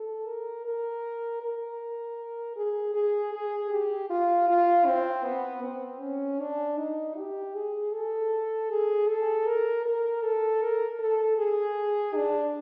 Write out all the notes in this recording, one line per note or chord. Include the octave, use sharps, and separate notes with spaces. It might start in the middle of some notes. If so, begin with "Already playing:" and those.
Already playing: A4
A#4
A#4
A#4
G#4
G#4
G#4
G4
F4
F4
C4
B3
C4
C#4
D4
D#4
G4
G#4
A4
G#4
A4
A#4
A#4
A4
A#4
A4
G#4
D4